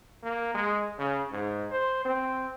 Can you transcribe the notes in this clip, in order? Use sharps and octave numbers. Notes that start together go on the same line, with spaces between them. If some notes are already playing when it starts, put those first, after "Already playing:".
A#3
G#3
C#3
G#2
C5
C4